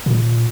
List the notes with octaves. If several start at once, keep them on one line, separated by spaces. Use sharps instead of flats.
A#2